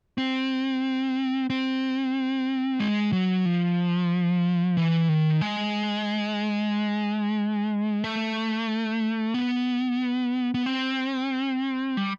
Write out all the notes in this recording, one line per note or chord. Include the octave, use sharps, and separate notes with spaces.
C4
C4
G#3
F#3
F3
E3
D#3
G#3
A3
B3
B3
C4
G3